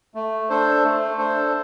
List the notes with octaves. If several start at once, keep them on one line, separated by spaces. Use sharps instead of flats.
A3
D4 A4 C5
A3
D4 A4 C5